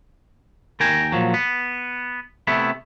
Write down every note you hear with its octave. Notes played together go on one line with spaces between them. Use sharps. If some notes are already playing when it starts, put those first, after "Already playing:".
D#2 A#4 G5 G#5 A#5
A#2 F3 F#3
B3
C3 A3 B3 E4